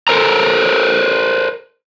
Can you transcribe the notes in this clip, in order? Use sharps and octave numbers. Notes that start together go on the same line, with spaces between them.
A4 A#4 C5 A#5